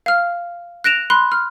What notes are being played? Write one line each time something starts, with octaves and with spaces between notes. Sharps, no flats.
F5 F6
F#6 A#6 D7 E7 F7
B5 C6 F#6
F6